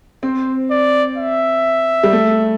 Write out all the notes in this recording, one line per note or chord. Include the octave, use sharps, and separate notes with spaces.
C4 C5
D5
E5
G3
A3